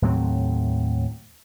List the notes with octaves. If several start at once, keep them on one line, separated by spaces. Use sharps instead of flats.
D#2 A2 F#3 C4